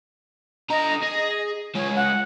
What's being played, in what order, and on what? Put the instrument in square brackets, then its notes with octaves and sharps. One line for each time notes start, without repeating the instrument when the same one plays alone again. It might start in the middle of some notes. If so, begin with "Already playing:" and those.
[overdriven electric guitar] D3 A#5 [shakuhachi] D#5
[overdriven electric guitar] G#4
[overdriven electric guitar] G#3 F4 [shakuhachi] C#5
[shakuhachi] F#5